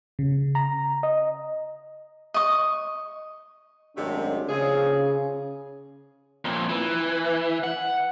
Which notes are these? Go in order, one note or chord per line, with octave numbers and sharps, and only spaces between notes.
C#3
A#5
D#5
D#5 C#6
G#1 F#2 C3 G#3 A3 D4
D#2 C#3 F3 G#4
F2 A#2
E3
F#5